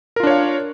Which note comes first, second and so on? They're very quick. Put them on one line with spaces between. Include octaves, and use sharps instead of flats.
A#4 F4 D4 C#5 F5